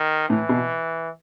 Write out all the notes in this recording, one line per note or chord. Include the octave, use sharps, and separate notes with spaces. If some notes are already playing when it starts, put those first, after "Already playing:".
Already playing: D#3
A2 E3
B2